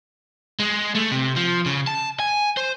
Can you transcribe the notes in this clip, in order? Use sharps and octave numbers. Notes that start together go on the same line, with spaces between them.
G#3
A3
C3
F3
C#3
A5
G#5
C5